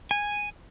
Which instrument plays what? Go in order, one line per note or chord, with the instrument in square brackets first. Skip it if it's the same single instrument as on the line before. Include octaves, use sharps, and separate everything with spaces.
[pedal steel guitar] G#5